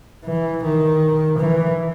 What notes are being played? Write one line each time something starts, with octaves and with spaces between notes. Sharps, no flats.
E3
D#3
E3